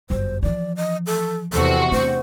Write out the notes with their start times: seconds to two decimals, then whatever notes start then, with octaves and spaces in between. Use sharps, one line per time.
0.10 G1 F#2 C5
0.43 E3 F3 D5
0.76 D#5
1.07 A4
1.53 E2 C3 F#4 A4
1.92 A3 D4 C5